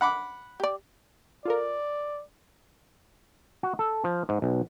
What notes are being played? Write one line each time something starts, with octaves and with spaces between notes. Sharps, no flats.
F#5 B5 D6
G4 D5
F4 A4 A#4 D5
F#4
A4
F3
G#2
B1